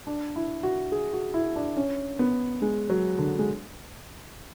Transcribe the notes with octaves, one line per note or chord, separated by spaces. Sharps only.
D4
E4
F#4
G#4
F#4
E4
D4
C#4
B3
G#3
F#3
D3
G#3